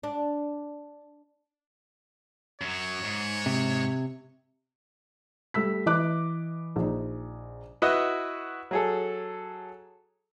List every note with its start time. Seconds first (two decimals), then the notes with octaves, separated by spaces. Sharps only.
0.03 D4
2.61 F#2 F#3 C#5
3.05 G#2
3.46 C3
5.54 G3 A3 E6 B6
5.86 E3 D#5 D6 F#6
6.76 A#1 D#4
7.82 E4 F#4 B4 D#5 F#5
8.71 F#3 G#4 A4